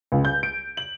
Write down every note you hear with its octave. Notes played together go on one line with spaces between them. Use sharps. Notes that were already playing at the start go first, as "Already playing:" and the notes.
C#2
G6
D7
F#7